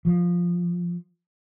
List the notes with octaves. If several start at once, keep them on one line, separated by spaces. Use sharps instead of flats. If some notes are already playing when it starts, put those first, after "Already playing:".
F3